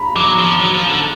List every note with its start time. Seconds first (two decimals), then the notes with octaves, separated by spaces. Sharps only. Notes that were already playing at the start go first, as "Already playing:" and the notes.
Already playing: A#5 B5
0.16 F#3 D6
0.38 F3
0.59 F#3
0.74 F3
0.89 D3